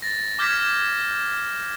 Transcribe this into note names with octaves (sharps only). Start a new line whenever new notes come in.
A6 A#6
D6 F6 G6 G#6 A#6 B6